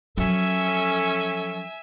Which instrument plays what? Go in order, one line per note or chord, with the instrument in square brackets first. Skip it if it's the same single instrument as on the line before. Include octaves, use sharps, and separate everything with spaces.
[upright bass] F3 F#3 [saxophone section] C#4 A4 [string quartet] E5 G#5